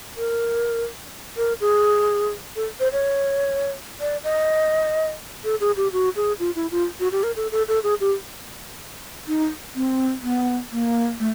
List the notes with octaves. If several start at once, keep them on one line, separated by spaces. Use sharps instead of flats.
A#4
A#4
G#4
A4
C5
C#5
D5
D#5
A4
G#4
G4
F#4
G#4
F4
E4
F4
F#4
G4
A#4
A4
A4
A4
G#4
G4
D#4
C4
B3
A#3
A3